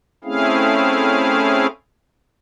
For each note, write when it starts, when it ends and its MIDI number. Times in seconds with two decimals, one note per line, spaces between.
0.24 1.67 57
0.24 1.67 60
0.24 1.67 61
0.24 1.67 64
0.24 1.67 68
0.24 1.67 77